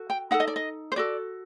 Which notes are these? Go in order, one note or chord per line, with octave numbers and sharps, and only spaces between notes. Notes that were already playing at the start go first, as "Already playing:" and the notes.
Already playing: F#4 A4
G5
D#4 A4 F#5
D#5
D5
D#5
C5
F#4 A4 D5